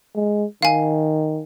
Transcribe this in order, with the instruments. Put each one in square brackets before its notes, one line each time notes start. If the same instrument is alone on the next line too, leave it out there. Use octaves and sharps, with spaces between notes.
[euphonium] G#3
[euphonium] D#3 [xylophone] F5 G#5